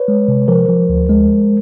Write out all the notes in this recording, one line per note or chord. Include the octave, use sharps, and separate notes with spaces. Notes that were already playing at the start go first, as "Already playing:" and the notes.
Already playing: B4 C#5
G#3
C3
F3 A#4 C5
F3
D2
G#3